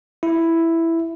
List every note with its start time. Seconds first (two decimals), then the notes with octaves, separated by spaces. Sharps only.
0.23 E4